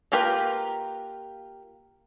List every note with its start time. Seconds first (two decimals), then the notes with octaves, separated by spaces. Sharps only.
0.12 A#3 F4 G4 A#4 B4